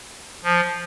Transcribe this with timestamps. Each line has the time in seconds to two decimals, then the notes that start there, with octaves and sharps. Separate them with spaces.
0.44 F3